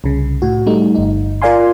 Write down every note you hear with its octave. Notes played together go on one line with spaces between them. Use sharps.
C2 C#3
A2 F#4
G3 A3 D#4
G1 D#4
F4 A#4 D5 F5 G#5 C6